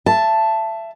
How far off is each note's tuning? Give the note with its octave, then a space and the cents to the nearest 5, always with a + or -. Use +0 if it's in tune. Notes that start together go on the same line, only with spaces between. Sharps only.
E5 +25 A5 +0